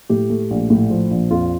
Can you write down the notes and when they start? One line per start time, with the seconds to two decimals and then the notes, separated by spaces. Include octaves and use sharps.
0.10 A2 G4
0.30 A3
0.51 A#1
0.70 A2
0.90 F3
1.11 A#1
1.31 F2 F4